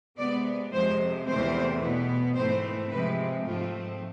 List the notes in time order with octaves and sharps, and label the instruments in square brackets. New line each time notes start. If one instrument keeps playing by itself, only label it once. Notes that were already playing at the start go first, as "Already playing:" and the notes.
[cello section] C3 G#3 B3 D5
F2 C3 F3 G#3 C5
E2 C3 E3 A3 C4 C5
B2 B3
G#2 E3 A3 C4 C5
C3 F3 G#3 B4
G#2 F3 A3 C4 F4